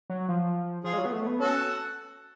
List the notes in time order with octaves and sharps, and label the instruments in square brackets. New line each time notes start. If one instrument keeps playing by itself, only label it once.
[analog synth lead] F#3
F3
[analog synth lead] F3 [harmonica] F4 G#4
[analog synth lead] G#3
F#3
B3
A3
B3
[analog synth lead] C#4 [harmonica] F#4 A4